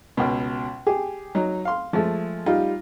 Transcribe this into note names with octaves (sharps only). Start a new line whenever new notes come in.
C#2 B2
G4 G#4
F#3 D#4
F5 C6
F3 G#3 A3
G3 D#4 F4